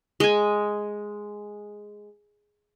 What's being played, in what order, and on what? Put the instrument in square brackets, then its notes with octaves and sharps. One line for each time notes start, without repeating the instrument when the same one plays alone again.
[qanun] G#3 G#5